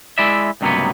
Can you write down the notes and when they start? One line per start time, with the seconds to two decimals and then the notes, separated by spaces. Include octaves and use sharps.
0.18 G#3 E4 D5 E5
0.61 C#2 G2 C3 F#3 A#3 B3